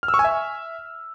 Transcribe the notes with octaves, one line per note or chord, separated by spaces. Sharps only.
F6
E6
C#6
G#5
E5